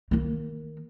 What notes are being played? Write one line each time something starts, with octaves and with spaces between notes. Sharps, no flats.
D#3 A#3